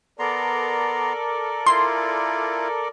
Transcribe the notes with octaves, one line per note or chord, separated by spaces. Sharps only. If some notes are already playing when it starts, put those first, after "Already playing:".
B3 A4 A#4 D5 A#5 C6
E4 F4 C6